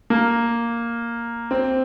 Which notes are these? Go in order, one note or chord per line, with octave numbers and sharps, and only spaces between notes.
A#3
C4